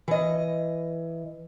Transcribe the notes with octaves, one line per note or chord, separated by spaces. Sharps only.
E3 D#5